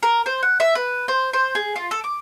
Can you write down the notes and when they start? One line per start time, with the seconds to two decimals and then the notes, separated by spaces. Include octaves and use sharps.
0.03 A#4
0.26 C5
0.43 F#5
0.60 E5
0.75 B4
1.08 C5
1.33 C5
1.55 G#4
1.76 F4
1.91 A4
2.04 D6